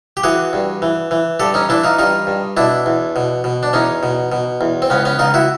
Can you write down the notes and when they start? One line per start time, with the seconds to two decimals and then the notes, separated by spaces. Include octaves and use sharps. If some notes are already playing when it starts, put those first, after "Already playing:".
0.17 G4
0.23 E3 F#4 G#4
0.53 G2
0.82 E3
1.11 E3
1.40 G2 G4 A4
1.54 C#4 D#4
1.69 E3 D4 E4
1.84 D#4 F4
1.99 G2 D#4 F4
2.27 G2
2.57 B2 D4 E4
2.86 E2
3.16 B2
3.44 B2
3.63 D4
3.73 E2 C#4 D#4
4.03 B2
4.32 B2
4.61 E2
4.82 C4
4.90 C#2 B3 C#4
5.05 B3 C#4
5.19 C#2 D#4 F4
5.34 E4 F#4